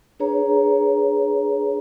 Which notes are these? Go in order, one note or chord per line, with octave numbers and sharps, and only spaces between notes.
D4 G#4 B4 C#5 A#5